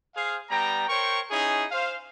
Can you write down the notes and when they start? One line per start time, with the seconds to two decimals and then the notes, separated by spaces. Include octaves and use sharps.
0.16 G#4 C5 F5
0.50 G3 B3 G5 A#5
0.89 A#4 C5 C#5 G5 C#6
1.31 C#4 D#4 E4 G#4
1.71 C5 F5